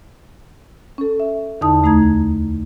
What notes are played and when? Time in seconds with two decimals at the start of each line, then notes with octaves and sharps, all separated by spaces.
0.98 C#4 A4
1.20 E5
1.61 E2 D3 D#4 A5 D#6
1.83 D2 A3 D#4 A#5 G#6